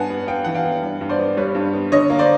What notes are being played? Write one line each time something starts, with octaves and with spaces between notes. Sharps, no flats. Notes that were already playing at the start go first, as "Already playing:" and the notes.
Already playing: G2 B3 F#5 G#5 A5
B3
B3 F5 G5
E3 F#5
F5 G5
B3
G2
G2
C5 D5
B3
G3 B4 C#5
G2
B3
D3 C#5 D#5
A#3
C5 D5